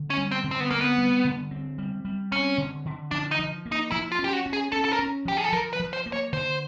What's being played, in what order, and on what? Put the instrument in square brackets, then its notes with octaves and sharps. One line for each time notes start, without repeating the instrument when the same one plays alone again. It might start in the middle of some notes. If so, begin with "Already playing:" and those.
Already playing: [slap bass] D3
[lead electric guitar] C#4
[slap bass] G3
[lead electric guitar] C4
[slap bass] D3
[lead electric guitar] C4
B3
[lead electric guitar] A#3 [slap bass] C4
[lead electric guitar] B3
[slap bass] G3
D3
C4
G3
G3
[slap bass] C4 [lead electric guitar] C#4
[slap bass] D3
D3
[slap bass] F3 [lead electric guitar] D4
[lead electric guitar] D#4
[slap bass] F3
A#3
[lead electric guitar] D#4
[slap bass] F3 [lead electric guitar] E4
[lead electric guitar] F4
[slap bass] C#4
[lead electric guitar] G4
F#4
[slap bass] C#4
[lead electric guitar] G#4
[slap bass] C#4 [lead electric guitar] A4
[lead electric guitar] A4
A#4
[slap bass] C#4
[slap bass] F3 [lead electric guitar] G4
[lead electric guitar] G#4
A4
[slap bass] F3 [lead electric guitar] A#4
[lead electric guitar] B4
[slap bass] F3
[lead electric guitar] C5
[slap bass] A#3
[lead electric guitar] C#5
[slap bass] D3 [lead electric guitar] C5